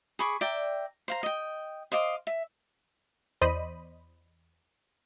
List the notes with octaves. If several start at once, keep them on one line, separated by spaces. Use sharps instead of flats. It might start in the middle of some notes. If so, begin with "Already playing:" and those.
G#4 B5 C#6 D6
D5 E5 G5 A#5
C5 F5 A#5
D#5 G5
C5 D#5 F5 D6
E5
E2 C5 D5 D#5 B5 D#7